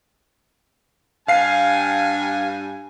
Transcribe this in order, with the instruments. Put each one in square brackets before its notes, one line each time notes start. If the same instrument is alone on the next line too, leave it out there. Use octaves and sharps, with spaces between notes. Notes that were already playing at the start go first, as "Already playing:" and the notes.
[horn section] G2 G#5 [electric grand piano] F5 C7